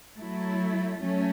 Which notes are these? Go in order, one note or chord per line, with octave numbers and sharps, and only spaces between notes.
F#3 A3 E4
F#3 A3 C#4